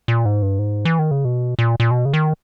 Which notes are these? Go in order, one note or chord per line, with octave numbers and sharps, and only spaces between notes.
A#2
G#2
G2
G#2
E3
D#3
C#3
B2
A#2
A#2
B2
C#3
D#3